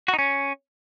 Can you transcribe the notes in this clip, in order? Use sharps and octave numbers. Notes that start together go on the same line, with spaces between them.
F#4
D#4
C#4